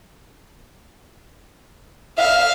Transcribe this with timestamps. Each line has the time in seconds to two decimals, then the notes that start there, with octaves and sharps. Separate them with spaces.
2.18 E5 F5